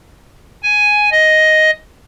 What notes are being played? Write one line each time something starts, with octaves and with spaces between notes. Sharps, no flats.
G#5
D#5